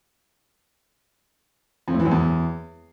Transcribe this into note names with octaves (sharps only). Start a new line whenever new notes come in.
F2
A2
E3
F#2
E2